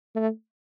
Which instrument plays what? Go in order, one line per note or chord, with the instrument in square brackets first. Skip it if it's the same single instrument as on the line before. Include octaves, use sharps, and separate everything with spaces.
[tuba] A3